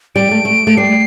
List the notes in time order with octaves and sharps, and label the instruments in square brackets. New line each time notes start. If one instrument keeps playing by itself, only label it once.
[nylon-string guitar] G3 [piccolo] D7
[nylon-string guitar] A3
A3
A3
[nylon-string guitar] G3 [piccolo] C7